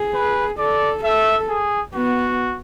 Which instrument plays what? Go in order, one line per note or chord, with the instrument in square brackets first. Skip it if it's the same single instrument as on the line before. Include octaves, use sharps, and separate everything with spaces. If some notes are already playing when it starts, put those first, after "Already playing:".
Already playing: [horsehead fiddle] G#4
[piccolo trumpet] B4
[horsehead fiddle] A4 [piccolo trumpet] D5
[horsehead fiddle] A4 [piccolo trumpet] E5
[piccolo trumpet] G#4
[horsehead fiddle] B3 [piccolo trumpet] F#4